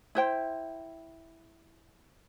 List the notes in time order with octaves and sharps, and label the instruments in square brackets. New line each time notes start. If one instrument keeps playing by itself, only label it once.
[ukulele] E4 C5 G5